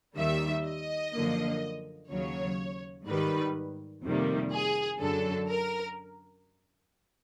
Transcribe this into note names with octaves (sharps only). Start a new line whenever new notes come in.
D#2 D#3 G3 E5
D#5
F#2 D3 F3 A#3
D#2 C#3 F#3 C#5
G#2 D#3 G3 B4
F2 C3 D#3 G3 A#3
G#4
F#2 D3 F#3 A4
A#4